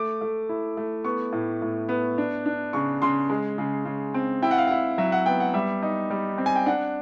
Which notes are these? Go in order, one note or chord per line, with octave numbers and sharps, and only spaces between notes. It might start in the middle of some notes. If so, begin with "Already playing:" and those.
Already playing: A3 D6
A3
E4
A3
B3 C#6
A2
A2
B3
D4
D4
C#3 C#6
C#3 C6
G#3
C#3
C#3
C4
E4 G5
F#5
F5
E4 F#5
F#3 E5
F#5
B3 G5
F#5
G3 E5
D#4
G3
C4
G#5
G5
D4 F#5